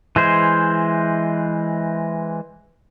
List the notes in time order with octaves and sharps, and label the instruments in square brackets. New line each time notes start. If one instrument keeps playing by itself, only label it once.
[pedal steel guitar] E3 G#3 C5